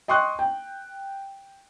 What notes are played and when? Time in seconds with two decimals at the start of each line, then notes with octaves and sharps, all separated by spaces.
0.08 D#5 G5 C6 C#6 D#6 F#6
0.39 G5